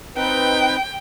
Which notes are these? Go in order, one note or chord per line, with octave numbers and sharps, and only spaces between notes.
C4 D#4 B4 G5